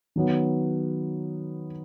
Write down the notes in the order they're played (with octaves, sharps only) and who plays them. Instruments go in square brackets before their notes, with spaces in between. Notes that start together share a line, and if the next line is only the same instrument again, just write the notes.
[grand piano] D#3 F#3 B3